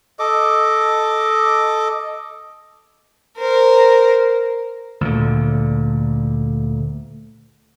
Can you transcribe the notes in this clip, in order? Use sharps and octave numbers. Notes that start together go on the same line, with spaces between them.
A4 D#5 D6
A#4 C5
D2 A#2 D3